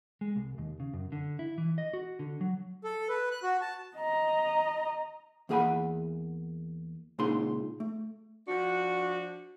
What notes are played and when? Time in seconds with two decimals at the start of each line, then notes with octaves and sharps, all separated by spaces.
0.21 G#3
0.36 C2
0.58 D#2
0.80 C#3
0.93 F#2
1.12 D3
1.39 E4
1.58 E3
1.78 D#5
1.93 F#4
2.19 D3
2.41 F#3
2.84 A4
3.09 B4
3.31 F#6
3.43 F#4
3.61 A5
3.97 D#5 A#5
5.49 E2 A#3 G#4 F#5 G#5 B5
7.19 C#2 A#2 C#3 D#4 G#4 C6
7.80 A3
8.48 F3 D4 F#4